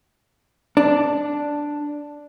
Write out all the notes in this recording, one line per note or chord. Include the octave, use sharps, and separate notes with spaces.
D4